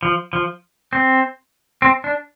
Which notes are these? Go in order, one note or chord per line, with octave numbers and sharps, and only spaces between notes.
F3
F3
C4
C4
D4